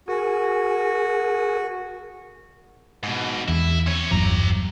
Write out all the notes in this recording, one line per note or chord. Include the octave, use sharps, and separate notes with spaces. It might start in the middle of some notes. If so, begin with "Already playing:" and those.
F#4 G#4 A#4 G#5
G#2 B2
E2 E4
C4 C#5
G1 E2 F#3 G4 A#5